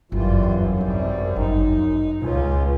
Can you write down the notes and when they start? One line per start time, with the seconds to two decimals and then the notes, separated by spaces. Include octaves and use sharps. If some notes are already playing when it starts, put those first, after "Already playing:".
0.12 G1 F#2 E3 G3 F4
0.43 D#2
0.80 G#1 F2 C3 G3
1.36 G1 D#2 D#4
1.72 D#3
2.23 C#2 C#4 F4